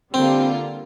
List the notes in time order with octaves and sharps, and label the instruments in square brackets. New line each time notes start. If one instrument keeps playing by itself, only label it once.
[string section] D3 G3 A#3 F4 [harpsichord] C4